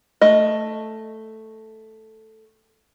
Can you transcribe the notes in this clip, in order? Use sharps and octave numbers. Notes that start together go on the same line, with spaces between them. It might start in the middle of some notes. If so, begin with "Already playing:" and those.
A3 D#5